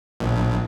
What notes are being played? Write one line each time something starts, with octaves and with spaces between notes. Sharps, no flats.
A#1